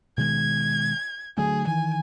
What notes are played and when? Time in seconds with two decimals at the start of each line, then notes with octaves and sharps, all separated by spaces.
0.18 B2 D#3 G#3 G#6
1.38 D3 F#3 A3 G#4
1.67 D#3 E3 G#5